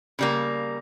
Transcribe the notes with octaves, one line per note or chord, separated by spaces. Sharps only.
C#3 G3 A#3